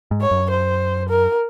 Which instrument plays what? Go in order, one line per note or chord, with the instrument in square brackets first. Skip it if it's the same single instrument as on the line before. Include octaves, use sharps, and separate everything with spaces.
[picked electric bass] G#2
[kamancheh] C#5
[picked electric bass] F#2
[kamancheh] C5
A#4